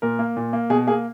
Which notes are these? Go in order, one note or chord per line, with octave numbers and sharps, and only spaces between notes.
A#2 A#4
A#3
A#2
A#3
B2 G#4
A#3 G#4